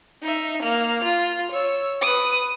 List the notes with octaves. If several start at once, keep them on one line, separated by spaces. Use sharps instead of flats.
D#4 E5
A#3 F6
F4
C#5 E6
B4 D#6